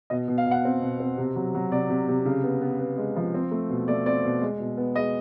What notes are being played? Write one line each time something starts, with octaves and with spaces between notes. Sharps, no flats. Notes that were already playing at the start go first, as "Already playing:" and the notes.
B2 D#5
B2
F5
B2
F#5
C4
B2
C4
C3
F#3
F#3
C3 D5
C3
C3
C#3
B3
B3
B3
G#3
F3
C4
A3
B2
A3 D5
C4 D5
B2
G#3
B2
B3
G#3 D#5